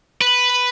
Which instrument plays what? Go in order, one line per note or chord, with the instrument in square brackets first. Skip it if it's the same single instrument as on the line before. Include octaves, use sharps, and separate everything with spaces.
[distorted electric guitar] B4